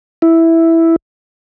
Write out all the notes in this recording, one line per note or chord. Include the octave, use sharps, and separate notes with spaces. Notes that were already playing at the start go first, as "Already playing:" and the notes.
E4